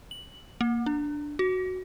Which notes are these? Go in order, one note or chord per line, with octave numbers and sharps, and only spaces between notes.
F#7
A#3
D4
F#4